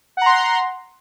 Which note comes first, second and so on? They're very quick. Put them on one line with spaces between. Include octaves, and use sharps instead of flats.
F#5 A#5 C6